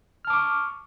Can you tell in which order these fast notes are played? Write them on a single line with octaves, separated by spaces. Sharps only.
F6 A5 D6 C#6